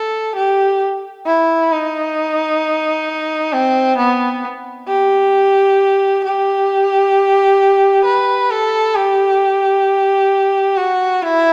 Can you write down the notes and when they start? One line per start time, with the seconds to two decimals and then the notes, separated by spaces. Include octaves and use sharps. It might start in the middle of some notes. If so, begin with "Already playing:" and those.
Already playing: A4
0.36 G4
1.26 E4
1.72 D#4
3.52 C4
3.98 B3
4.88 G4
6.24 G4
8.05 B4
8.51 A4
8.95 G4
10.77 F#4
11.22 E4